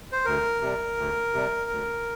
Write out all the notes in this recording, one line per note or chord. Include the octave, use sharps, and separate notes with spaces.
C5
D2 A#4
C3 G3
D2
C3 G3
D2